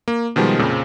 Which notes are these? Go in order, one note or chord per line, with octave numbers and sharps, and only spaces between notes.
A#3
B2 D#3 F3 G3 G#3
F2 A#2 C#3 C4